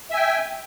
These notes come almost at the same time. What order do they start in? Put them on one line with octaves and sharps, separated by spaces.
E5 G#5 G5